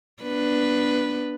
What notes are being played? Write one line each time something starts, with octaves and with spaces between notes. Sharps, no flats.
B3 D4 B4